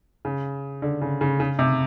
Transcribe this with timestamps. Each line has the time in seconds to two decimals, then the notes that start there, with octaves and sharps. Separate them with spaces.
0.25 C#3
0.82 D3
1.01 C#3
1.21 C#3
1.40 C#3
1.59 C3